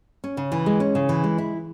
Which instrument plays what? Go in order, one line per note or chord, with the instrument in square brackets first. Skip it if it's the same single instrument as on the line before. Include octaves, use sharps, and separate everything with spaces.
[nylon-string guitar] C#4
C#3
E3
G#3
C#4
C#3
E3
G#3
E4